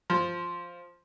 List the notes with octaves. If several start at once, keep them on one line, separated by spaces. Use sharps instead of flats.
F3